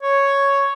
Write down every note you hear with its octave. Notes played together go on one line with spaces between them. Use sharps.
C#5